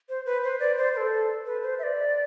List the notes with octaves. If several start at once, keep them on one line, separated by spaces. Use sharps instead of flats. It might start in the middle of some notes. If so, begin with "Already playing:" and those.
C5
B4
C5
D5
C5
B4
A4
B4
C5
E5
D5